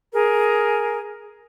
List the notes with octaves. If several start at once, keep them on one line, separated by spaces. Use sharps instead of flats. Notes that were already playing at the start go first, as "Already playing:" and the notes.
G#4 A#4